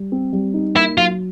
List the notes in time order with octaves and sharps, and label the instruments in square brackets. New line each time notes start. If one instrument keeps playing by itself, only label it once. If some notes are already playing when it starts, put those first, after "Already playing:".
Already playing: [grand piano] G3
C4
G3
D#4
[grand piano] A#3 [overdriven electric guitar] E4
[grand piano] F#3 [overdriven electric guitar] F4